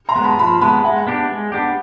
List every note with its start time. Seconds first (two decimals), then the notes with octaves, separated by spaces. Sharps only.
0.09 A#5 C6
0.16 G#3 B3
0.24 A5 B5
0.38 F3 A5 B5
0.61 G#3 B3 A5 B5
0.84 G#3 E5 F#5
1.07 B3 D4 G4
1.29 G#3
1.52 B3 D4 G4